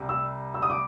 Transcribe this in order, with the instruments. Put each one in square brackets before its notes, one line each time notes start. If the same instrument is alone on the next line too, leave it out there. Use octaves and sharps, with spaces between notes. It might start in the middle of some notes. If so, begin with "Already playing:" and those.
Already playing: [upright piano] C2 C3 G3
[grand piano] E6
E6
D#6
D6